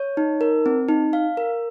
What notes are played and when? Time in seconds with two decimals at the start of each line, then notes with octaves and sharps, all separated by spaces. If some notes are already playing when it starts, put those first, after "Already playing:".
Already playing: C#5
0.17 D#4
0.41 A#4
0.66 C4
0.89 D#4
1.13 F5
1.37 A#4